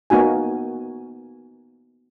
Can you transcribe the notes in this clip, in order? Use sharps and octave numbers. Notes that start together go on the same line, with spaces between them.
A#3 B3 D#4 F#4 G#5